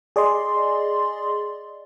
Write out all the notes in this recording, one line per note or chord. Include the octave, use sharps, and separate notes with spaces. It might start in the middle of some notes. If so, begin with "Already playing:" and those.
G#4 D5 D#5 C6